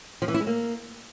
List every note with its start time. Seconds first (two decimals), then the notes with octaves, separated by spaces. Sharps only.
0.22 F3
0.28 E3
0.34 E4
0.41 G#3
0.47 A#3